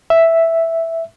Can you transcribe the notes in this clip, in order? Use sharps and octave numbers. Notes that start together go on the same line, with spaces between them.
E5